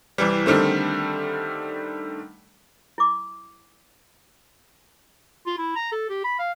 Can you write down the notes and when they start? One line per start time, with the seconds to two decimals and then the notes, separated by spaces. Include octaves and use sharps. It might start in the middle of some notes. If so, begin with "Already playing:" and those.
0.18 C2 E3 G3
0.46 D3 D#3 G3 A3 C4
2.98 E4 D6
5.46 F4
5.58 E4
5.75 A#5
5.92 A4
6.09 G4
6.24 B5
6.39 F5